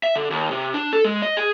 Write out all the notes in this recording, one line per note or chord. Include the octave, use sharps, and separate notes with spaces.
E5
D3
D#2
C3
D4
A4
G#3
D#5
G#4